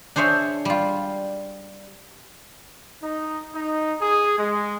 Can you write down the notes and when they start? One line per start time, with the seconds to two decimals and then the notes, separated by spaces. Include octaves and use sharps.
0.16 D4 G#4 C5 C#5 E5
0.65 G3 F4
3.01 D#4
3.53 D#4
4.01 G#4
4.38 G#3